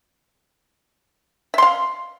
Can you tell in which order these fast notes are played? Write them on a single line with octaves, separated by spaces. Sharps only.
E5 C6 F5